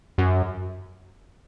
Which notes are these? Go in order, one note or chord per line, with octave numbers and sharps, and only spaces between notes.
F#2